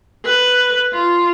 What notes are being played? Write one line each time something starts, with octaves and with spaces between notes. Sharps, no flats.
B4
F4